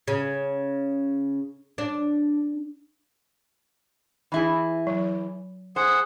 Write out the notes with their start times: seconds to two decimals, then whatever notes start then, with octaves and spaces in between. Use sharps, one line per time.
0.08 C#3
1.78 D4
4.32 E3 E4 G#4
4.87 F#3
5.76 G#4 C5 F#5